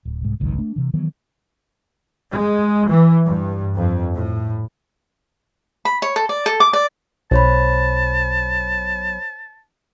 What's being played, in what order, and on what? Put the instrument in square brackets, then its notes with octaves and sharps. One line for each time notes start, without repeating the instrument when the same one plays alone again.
[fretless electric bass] D1
C2 G#2
G#1 C#2 F#2 D#3
A3 D4
C3 E3
D#3 E3 F#3 B3
[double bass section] G#3
E3
G2
F2
A2
[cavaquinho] B5
C#5
A4
D5
A4
D6
D5
[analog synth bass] B1 [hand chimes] C5 C#5 B5 [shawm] A5